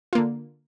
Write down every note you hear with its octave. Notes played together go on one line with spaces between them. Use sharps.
D3 A#3 F4